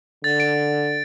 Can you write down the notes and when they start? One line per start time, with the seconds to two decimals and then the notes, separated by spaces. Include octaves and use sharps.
0.24 D3 A6
0.40 D7